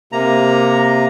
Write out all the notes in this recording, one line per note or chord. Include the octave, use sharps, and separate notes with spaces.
C3 A#3 A#5